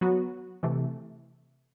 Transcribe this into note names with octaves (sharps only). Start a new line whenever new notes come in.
F#3 B3 F#4
C3 E3 A3